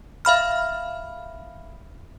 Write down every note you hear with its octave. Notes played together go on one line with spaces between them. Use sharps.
E5 F5 B5 F6